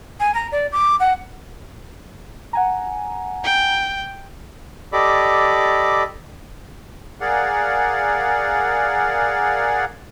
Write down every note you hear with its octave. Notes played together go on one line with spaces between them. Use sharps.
G#5
A#5
D5
D6
F#5
F#5 G#5 A#5
G5
G4 A4 D5 D#5 B5 D6
G#4 A#4 D5 F5 F#5